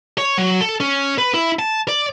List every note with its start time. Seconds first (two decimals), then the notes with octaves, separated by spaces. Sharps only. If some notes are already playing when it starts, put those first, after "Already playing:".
0.18 C#5
0.38 F#3
0.61 A4
0.80 C#4
1.18 B4
1.34 E4
1.59 A5
1.88 D5